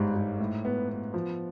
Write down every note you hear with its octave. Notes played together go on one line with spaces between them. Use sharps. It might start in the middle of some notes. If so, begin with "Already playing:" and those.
Already playing: G1 G#2 G3
G#2
A2
B3
B3
F3